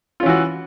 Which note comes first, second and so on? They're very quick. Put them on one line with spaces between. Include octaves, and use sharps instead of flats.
F4 C#4 E3 F#4